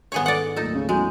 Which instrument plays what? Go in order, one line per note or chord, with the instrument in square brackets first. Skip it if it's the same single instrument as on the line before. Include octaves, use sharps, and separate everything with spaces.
[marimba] G#2 D#3 [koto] B3 G#4 C#5
[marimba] D#4 A4 [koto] D5 F#5
[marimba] D2 F#3 A3 [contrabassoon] A#2 [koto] D#4 A4
[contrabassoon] C#3
[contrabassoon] F#3 [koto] G#3 [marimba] B3 E4 G6